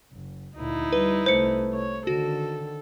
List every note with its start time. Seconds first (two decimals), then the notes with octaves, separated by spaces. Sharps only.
0.12 F#1
0.57 D2 A#2 D#4 E4
0.92 G3 B4
1.26 C2 A3 C5 C#7
1.73 C#5
2.07 D3 D#3 F#4 A4